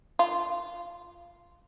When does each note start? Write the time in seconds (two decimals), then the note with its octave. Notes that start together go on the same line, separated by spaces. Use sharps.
0.19 F4